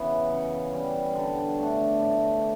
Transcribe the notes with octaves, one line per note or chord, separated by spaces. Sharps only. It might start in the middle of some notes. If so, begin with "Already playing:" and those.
Already playing: C#3 E3 B3
C#3
G3 C#4
D3
A3 D4
A2